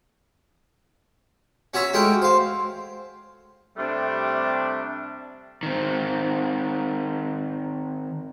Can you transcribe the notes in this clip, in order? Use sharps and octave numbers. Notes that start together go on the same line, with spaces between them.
C#4 F#4 C#5 E5 A#5
G#3 A3 F#4 G#4 A#4 G5
C5 F5
C3 G3 A3 D4
D#3 C4